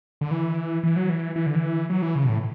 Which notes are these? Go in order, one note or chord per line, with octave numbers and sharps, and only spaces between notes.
D3
E3
E3
F#3
E3
E3
D3
E3
F#3
E3
C#3
B2
A2